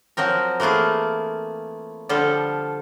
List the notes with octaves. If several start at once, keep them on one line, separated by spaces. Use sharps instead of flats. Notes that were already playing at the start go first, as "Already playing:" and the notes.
F3 F#3 C4 A#4
E3 A3 A#3 F4 G#4
D3 F3 G3 F4 A4